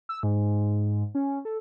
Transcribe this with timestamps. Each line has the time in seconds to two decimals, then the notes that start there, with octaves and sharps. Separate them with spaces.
0.09 E6
0.23 G#2
1.15 C#4
1.45 A4